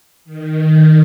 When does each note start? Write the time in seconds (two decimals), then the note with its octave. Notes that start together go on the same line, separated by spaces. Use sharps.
0.25 D#3